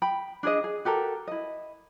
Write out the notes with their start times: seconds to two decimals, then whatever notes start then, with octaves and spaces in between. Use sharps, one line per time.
0.02 G5 B5
0.43 D4 G#4 D#5
0.64 G#4
0.85 F#4 G4 A4 A#4
1.27 E4 D#5